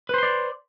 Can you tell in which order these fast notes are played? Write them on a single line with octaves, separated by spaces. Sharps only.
B4 C5 C6 D5